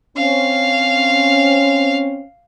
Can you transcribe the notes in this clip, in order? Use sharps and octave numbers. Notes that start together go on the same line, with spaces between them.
C4 C#4 F5